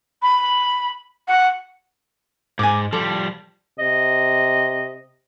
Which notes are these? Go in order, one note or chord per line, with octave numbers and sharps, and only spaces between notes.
B5
F#5
G#2 G#5 D6
F3 G3 A4 D6
C3 D#5